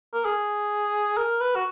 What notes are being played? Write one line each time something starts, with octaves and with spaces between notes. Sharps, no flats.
A#4
G#4
A#4
B4
F#4